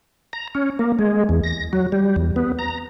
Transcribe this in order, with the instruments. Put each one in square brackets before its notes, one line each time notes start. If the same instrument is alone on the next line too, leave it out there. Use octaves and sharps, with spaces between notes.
[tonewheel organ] A#5
C#4
A#3
G#3
E2
A#6
F#3
G3
E2
B3
A#5